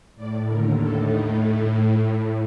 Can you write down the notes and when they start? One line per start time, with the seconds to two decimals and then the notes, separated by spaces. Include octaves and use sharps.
0.16 A2 D5
0.47 D#2 D3 A#4
0.77 A2 A4
1.08 A2 D#4